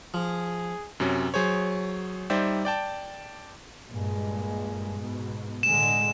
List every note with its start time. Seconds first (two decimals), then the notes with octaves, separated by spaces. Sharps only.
0.14 F3 G#4
1.00 F#2 C3 F#3 C#4
1.34 F#3 G#4 C5 C#5
2.30 G3 D#4 C5 D5 E5 G5
2.65 D5 G5 A5 D6
3.89 G2 A#2 G#3
4.99 G#2 B2
5.63 A2 D3 G#3 E7